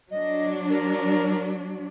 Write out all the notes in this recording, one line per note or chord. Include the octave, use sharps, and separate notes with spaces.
F#3 D4 D#5
A#4